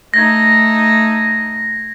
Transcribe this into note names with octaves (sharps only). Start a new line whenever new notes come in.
A3 D#4 G#6 A#6